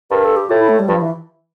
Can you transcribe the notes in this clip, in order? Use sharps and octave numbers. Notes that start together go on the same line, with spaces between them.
G2 A#4
A4
G4
A2 F4
E4
A3
G3
G2 F3
E3